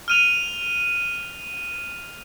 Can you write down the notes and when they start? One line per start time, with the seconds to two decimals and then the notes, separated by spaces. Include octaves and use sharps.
0.08 F6 D#7 F7